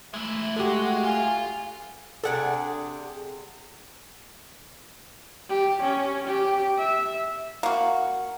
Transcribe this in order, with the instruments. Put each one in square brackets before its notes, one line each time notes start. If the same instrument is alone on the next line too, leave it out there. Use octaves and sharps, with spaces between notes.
[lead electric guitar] G#3 E4 [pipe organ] A3
[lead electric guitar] G#3 [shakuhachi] F#4 [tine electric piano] G4 A4
[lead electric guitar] F4 [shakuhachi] G#5
[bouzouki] C3 D4 G#4 [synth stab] A4 F#5
[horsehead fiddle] G4
C#4
G4
E5
[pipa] A#3 F#4